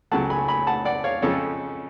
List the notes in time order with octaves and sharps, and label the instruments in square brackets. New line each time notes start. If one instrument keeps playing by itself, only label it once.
[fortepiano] C#2 C#3 F#3 A3 F#5 A5
G#5 B5
G#5 B5
F#5 A5
D5 F#5
C#5 F5
F2 C#3 F3 G#3 A4 C#5